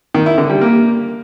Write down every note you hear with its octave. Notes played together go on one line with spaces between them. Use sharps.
D#3
E4
D3
G3
A#3